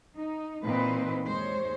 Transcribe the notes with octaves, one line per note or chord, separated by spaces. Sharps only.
D#4
A#2 E3 C4 D#4 B4 C5
D#2 G#3 C5 C#5